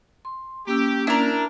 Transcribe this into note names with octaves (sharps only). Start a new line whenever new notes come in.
C6
A#3 C#4 G4 E6
D4 E4 A#4